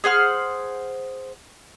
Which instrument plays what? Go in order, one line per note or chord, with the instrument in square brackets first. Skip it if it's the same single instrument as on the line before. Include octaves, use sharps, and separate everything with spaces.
[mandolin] G#4 C5 F#5 F6